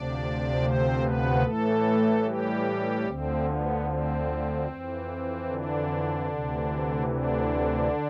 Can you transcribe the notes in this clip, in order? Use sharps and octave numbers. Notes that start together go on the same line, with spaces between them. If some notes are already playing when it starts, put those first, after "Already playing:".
Already playing: D2 C3 F3 D4 D5
C4 C5
B3 B4
A2 E3 A3 A4
G3 G4
D2 D3 F3 C4
B3
C4
F2 E3
D3 D4
D2 C3 E3
D3 D4